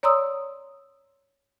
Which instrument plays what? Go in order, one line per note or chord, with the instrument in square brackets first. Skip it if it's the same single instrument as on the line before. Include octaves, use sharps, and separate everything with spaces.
[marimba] C#5 D5 A#5 C6 D#6 E6